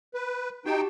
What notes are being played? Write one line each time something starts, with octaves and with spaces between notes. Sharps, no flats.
B4
D#4 F#4 G4 G5 A5